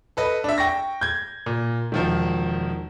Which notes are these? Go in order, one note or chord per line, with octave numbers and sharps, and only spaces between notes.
A4 B4 D#5
D4 E5
G5 C#6 A#6
G6 G#6
A#2
E1 D#3 F3